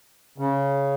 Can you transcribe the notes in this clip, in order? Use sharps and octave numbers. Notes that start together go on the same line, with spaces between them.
C#3